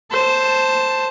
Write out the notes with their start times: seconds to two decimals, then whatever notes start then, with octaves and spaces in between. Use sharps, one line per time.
0.11 C5 A5